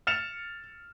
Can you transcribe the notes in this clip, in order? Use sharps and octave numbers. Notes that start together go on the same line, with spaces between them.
F6 A6 C#7 E7 F7